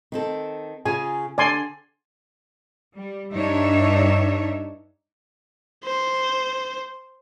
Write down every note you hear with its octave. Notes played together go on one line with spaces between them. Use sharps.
D#3 C4 A4
C#3 F4 G#4 G#5
D3 D4 D5 G#5 C6
G3
G2 D4 D#4 C#5 E5
C5